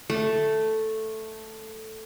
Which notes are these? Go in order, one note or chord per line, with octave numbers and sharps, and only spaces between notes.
A3